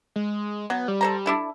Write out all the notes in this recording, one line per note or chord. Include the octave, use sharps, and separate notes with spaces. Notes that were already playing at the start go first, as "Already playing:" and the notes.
G#3
F#3 B3
G3
A4 C5 A#5
D4 E4 A4